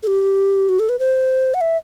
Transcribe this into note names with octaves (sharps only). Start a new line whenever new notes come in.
A4
G4
F#4
A4
B4
C5
F#5
E5